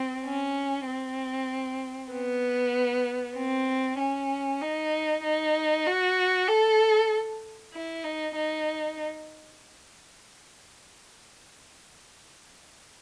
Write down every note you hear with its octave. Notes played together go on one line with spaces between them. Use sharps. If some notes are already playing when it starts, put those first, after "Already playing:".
Already playing: C4
C#4
C4
B3
C4
C#4
D#4
D#4
F#4
A4
E4
D#4
D#4